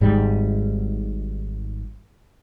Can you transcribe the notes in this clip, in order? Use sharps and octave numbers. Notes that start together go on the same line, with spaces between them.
G#1 G#2 G3